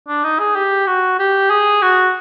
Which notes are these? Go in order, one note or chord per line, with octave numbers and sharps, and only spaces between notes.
D4
D#4
G#4
G4
F#4
G4
G#4
F#4